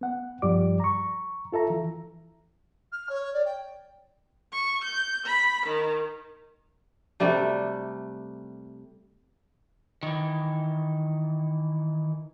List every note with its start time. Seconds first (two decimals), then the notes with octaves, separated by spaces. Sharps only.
0.01 B3 F#5
0.42 G2 F3 G3 G4 D5 D6
0.80 A#5 C#6
1.52 F4 A4 E5 A#5
1.70 E3
2.92 F6
3.10 C#5
3.33 D5
3.46 G5
4.52 C#6
4.82 G6
5.24 B5
5.65 D#3
7.20 C3 G3 A3 D4
10.03 D#3 E3